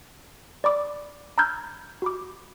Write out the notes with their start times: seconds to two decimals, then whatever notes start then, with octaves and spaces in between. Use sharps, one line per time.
0.64 D5 B5 D6
1.38 A#5 B5 E6 F6 G6 G#6
2.02 F#4 B5 D6